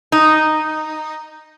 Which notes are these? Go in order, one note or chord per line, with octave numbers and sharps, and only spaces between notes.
D#4